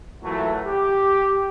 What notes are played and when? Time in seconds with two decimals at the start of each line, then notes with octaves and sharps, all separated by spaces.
0.23 A#2 E3 F#3 A3
0.66 G4